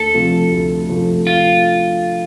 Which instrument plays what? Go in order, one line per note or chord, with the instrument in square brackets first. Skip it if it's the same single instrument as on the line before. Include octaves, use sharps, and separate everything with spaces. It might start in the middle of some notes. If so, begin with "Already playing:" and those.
Already playing: [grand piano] D2 [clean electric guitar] A4
[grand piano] C3 F3 A3 C4
D2
C3 F3 A3 C4
[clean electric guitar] F4